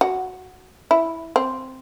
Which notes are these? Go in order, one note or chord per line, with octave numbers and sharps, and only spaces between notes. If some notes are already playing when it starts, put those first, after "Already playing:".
F#4
E4
C4